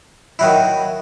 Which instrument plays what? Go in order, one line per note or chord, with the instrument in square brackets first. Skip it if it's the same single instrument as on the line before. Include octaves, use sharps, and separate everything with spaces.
[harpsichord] D#3 F#3 E4